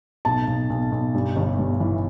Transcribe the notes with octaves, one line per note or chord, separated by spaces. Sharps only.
B1 A5
B1
B1
B1
G2
G1
G2
E3